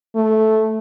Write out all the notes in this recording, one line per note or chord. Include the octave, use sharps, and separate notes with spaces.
A3